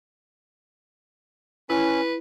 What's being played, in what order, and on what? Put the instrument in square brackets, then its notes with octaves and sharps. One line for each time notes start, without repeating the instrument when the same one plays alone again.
[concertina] C#4 [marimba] E4 [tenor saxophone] B4